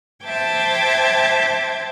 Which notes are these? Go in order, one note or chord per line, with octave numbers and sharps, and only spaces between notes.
C5 E5 G5 A5 D6 G#6